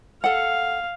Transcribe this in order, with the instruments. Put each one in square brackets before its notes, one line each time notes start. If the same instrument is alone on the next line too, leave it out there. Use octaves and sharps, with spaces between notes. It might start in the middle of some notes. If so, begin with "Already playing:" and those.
[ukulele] A4 F#5 [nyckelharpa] F5